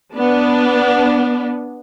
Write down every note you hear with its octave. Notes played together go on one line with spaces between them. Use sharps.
B3 D4